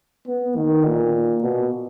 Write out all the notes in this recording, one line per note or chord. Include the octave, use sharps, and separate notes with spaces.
B3
D#3
A#2
B2